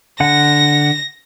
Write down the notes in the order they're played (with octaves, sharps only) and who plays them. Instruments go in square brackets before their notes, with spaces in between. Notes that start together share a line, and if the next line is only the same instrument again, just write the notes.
[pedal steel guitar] D3 F#5 [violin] A#6